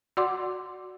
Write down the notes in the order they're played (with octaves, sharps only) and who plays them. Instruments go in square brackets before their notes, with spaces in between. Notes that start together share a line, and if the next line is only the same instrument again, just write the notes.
[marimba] F#4 D5 F#5 C6 D6